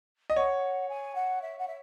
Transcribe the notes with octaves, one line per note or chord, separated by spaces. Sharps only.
D#5
C#5 F#5
G#5
F#5
E5
F#5
E5